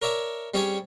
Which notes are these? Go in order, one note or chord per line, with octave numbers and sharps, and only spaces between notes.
A#4 C#5 D5 E5 A5
G3 C4 C#4 G#4 C#5 D5